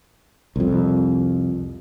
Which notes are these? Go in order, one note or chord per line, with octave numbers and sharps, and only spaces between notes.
C2 F2